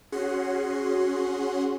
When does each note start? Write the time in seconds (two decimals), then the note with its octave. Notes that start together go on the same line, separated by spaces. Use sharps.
0.12 C#4 F#4 G#4 F#5 C6